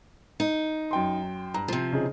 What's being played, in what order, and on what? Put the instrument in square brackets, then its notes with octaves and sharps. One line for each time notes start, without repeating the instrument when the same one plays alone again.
[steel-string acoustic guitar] D#4
[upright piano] F#2 G5 C6
[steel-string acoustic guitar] G2 [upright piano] A#5
[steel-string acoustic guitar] C3 F3
[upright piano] C#3 D#4 G#4